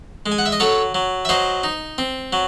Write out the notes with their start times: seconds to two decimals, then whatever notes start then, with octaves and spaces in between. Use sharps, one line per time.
0.26 G#3
0.32 G#5
0.38 F#5
0.46 E5
0.52 D#5
0.60 F#3 A4 C#5
0.95 F#3
1.25 E5
1.29 F#3 C5 D#5
1.64 D#4
1.98 C4
2.33 F#3